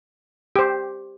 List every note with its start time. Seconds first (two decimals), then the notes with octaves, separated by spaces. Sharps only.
0.56 G4 C5